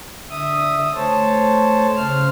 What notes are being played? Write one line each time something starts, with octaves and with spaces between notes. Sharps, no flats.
D3 E5 D#6
A3 C5 C#5 A5
C#3 C5 F6